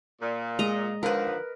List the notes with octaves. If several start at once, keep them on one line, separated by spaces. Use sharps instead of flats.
A#2
G#3 D#5 A#5
D3 D#3 F3 A#4 B4